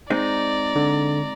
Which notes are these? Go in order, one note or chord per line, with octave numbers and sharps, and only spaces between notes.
G#3 C4 D#4 D5 A#5
D3